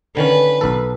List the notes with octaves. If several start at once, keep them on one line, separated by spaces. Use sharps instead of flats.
D3 D#3 C#4 B4
B1 A4